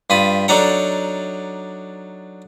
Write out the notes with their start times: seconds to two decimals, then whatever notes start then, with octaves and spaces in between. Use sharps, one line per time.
0.10 G2 F4 B5 D#6
0.48 F#3 D4 D#4 A4 F#5 A#5